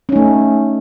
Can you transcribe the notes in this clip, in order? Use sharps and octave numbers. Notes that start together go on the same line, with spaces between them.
A3 C#4 D#4